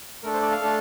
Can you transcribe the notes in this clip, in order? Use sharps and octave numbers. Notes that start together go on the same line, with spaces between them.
A3 D4 A4 A#4
C5
D5
F5
A3 D4 A4